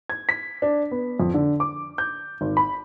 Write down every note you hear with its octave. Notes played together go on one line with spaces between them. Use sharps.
G#6
B6
D4
B3
F2
D3
D6
G6
G#1
B5